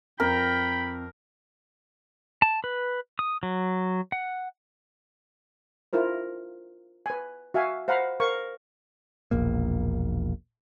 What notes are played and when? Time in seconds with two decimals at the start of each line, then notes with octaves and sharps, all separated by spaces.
0.20 F2 A#4 G5 B5
2.42 A5
2.64 B4
3.19 D#6
3.43 F#3
4.12 F#5
5.93 D4 E4 F4 A#4 C5
7.06 B4 G#5
7.54 F#4 E5 F5 G#5
7.88 C5 F5 F#5 A#5 B5
8.20 A#4 C5 F5 C#6
9.31 E1 A#1 A#3